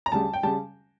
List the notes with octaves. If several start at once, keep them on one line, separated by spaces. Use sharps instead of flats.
A#5
D2 C#3 G3 A5
G5
C#3 G3 A5